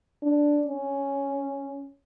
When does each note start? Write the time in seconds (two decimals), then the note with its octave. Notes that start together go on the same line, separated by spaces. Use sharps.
0.23 D4
0.67 C#4